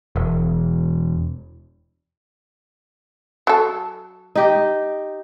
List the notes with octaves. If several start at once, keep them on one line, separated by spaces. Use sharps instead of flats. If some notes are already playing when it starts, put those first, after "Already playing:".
E1
F#3 A4
D#4 G4